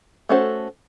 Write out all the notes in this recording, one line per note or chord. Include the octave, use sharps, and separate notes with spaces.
A3 C#4 F#4 A4 C5